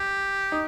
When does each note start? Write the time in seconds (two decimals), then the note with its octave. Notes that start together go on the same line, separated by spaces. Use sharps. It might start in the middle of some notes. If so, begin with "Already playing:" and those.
Already playing: G4
0.52 D#4